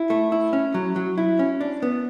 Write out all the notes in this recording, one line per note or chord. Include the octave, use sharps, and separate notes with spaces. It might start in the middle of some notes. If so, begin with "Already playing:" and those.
Already playing: E4
A3
E4
C#4
F#3
F#3
E4
C#4
D4
B3